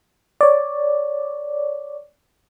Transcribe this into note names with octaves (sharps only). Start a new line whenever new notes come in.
C#5 D5